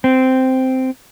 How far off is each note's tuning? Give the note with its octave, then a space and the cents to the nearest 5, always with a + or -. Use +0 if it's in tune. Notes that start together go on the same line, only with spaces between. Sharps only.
C4 -10